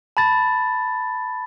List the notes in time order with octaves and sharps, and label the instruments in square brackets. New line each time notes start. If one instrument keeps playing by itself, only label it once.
[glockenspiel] A5 B5 A6